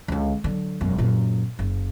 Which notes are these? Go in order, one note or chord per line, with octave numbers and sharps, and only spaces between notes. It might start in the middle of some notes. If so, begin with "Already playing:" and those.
C#2 D3
D3 F#3
E1 F#2
F#2 A#2
F#1